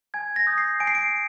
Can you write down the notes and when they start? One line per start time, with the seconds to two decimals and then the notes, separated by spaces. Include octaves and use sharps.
0.14 G#5 G#6
0.36 A#6
0.47 D#6 G6
0.58 C7
0.80 G#5 D7
0.87 C7
0.95 D7